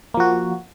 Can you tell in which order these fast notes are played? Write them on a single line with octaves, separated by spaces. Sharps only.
A#3 F3 F#4